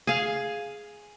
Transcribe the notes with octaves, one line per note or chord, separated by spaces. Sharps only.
G#4 F5